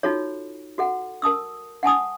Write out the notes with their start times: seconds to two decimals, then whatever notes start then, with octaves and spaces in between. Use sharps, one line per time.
0.03 D#4 F4 F#4 A4 C#5
0.78 F#4 A4 F#5
1.22 A#4 A5 D#6 E6
1.83 F#5 G#5 A5 D#6